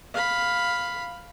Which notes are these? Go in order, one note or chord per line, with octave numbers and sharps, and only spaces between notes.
F5 B5